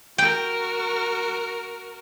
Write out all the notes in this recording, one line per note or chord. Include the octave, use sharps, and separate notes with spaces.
F#4 A#4 G5